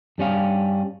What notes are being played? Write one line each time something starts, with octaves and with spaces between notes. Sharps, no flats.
G2 G3 C#4 F5